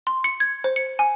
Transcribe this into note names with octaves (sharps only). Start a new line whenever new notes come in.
C6
C#7
G#6
C5
C#7
G#5